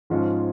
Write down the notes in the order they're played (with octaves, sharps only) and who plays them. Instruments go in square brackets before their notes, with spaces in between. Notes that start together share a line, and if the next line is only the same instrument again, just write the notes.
[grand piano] G#2 F3 G#3 C#4 F4